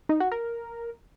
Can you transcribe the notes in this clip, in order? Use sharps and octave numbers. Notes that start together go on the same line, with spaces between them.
D#4
F#4
A#4